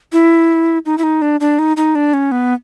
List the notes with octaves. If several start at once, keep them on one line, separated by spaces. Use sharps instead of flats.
E4
D#4
E4
D#4
D4
D4
D#4
D#4
D4
C#4
B3